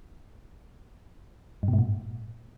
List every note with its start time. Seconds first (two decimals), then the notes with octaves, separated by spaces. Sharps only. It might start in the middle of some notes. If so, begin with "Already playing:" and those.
1.63 G2
1.68 B2
1.73 G#2
1.79 A#2